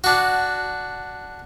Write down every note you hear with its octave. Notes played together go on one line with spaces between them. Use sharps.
D4 F#4